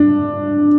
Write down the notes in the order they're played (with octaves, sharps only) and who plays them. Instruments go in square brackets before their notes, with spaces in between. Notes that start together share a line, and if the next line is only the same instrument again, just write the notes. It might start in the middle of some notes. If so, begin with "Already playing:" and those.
Already playing: [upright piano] D4